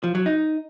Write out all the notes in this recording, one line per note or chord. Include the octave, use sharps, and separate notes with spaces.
F3
F#3
D#4